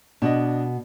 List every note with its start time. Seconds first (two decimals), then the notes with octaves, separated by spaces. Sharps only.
0.22 B2 D4 D#5